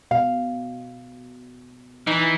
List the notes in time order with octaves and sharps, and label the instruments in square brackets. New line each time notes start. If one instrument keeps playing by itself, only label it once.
[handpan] B2 [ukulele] F5
[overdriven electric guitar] E3 [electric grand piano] D#4